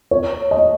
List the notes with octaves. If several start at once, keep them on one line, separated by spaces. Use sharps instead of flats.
C#5
D#5